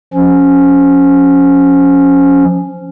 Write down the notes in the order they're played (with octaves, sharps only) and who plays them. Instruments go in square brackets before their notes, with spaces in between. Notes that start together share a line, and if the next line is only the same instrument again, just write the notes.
[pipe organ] F3 C#4